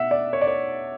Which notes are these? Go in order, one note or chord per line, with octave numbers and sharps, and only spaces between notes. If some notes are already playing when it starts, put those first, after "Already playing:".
Already playing: B2 E5 F#5
D5
C#5
D5
C#5